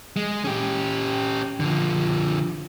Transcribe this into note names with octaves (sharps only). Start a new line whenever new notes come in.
G#3
C#4 G4
D3 F3